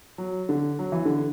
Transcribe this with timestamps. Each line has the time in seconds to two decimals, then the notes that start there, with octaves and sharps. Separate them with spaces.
0.18 F#3
0.49 D3
0.79 F#3
0.92 E3
1.05 D3